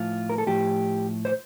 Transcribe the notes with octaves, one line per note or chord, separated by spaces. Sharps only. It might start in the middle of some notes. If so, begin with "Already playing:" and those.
Already playing: A2 F3 F4
A#4
A4
A2 F3 G4
C5